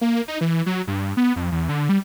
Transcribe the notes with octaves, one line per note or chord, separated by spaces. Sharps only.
A#3
D#4
E3
F#3
G2
B3
F2
E2
D3
G3